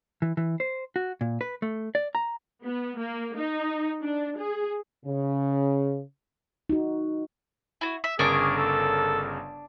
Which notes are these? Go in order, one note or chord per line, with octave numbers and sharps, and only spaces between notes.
E3
E3
C5
F#4
A#2
B4
A3
D5
A#5
B3
A#3
D#4
D4
G#4
C#3
D#4 F#4
E4 F#4
E5
G1 C#3 D4 G#4 A#4 C#6 D6
A4